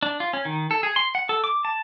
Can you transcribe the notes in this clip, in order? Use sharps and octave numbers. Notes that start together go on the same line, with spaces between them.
D4
F4
C#4
D#3
A4
G#4
C6
F#5
A4
D6
A5